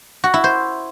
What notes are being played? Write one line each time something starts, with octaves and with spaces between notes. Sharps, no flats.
F#4
E4
C5